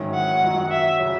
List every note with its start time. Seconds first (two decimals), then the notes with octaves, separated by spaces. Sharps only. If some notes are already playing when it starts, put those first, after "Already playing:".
Already playing: G#2 D#3 F#3 C#4 E4
0.14 F#5
0.42 F#2 D#3 F#3
0.71 E5
0.99 C#3 F#3